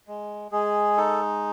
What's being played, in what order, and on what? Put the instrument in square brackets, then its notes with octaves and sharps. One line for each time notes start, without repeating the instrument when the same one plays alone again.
[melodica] G#3
G#3 G#4
D#4 A4